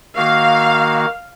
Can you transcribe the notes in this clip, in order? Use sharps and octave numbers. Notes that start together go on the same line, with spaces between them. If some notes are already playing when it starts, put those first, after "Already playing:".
D#3 A#3 F#4 F5